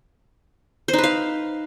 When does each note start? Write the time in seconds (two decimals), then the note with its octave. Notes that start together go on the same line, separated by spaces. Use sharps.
0.88 C5
0.93 D#4
0.98 B4
1.04 F5